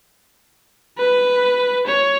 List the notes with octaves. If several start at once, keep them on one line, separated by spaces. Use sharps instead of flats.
B4
C#5